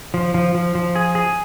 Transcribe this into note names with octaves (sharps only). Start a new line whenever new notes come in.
F3
F3
F3
F3
G#4
G#4